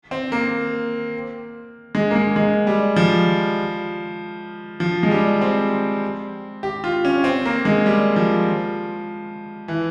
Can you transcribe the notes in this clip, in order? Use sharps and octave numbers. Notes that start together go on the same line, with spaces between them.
C4
A#3
G#3
A#3
G#3
G#3
G3
F3
F3
G#3
G3
C4
G4
F4
C#4
C4
A#3
G#3
G3
F3
E3